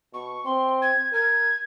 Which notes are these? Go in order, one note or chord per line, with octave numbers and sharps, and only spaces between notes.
B2 C#6
C4 C6
G#6
A#4 G#6